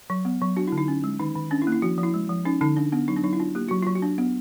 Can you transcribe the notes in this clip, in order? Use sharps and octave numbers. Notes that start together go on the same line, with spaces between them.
F#3
B3
F#3
D4 F#4
E4
D3
D#4
C#4
G#3
D#3 D#4
D#3
C#4 D4
E4
A#3
E4
F3 F#4
F3
E4
G#3
F3
C#4 D#4
D3 D#4
D4
B3 D4
F#3 D#4
D4
F#3 D#4
E4
D4 F4
A#3 G4
F#3 F#4
F#3 F4
F#4
D4
B3